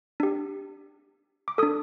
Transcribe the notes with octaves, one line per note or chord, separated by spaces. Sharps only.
D4 G4
D6
D4 A4 D#6